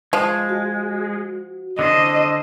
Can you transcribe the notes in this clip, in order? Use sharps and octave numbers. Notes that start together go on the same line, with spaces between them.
F3 G#3
F#4
D3 D4 C5 D#5